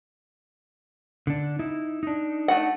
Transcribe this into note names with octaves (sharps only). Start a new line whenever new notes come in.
D3 D4
D#4 E4
D4 D#4
A3 F#4 F#5